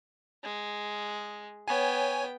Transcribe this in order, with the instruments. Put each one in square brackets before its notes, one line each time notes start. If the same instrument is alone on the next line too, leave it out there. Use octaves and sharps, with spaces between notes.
[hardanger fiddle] G#3
[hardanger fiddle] B3 G5 [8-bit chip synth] C#5 G#5